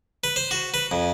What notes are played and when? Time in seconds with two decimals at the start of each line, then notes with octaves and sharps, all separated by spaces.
0.24 B4
0.36 C5
0.51 F#4
0.74 B4
0.91 F2